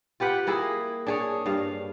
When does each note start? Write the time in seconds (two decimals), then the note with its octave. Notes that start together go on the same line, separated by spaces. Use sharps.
0.20 F4 G4 B4 F#5
0.47 A#3 E4 G#4
1.07 D4 G#4 C#5
1.46 G2 F5